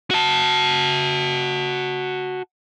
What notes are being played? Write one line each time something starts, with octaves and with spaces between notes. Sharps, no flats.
F#4 A5